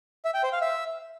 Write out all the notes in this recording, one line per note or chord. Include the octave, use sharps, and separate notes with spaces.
E5
G5
C5
F5
E5